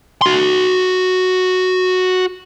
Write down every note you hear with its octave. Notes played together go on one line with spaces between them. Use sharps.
F#4 C6